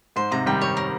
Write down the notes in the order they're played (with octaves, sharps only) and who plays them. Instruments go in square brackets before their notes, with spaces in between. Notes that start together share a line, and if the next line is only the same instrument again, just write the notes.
[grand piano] G#2 [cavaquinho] C5
[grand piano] G#2 C3 [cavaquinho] A#5
[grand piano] D#3 G3 [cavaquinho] G5
[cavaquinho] C#5
A#4